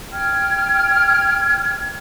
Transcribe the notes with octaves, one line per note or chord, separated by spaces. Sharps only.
G5 F6 G#6